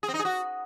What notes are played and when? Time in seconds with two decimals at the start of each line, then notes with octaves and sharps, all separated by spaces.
0.03 G#4
0.08 C4
0.14 D#4
0.19 G#4
0.25 F#4